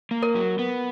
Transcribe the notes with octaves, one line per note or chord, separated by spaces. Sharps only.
A#3
A#4
F#3
B3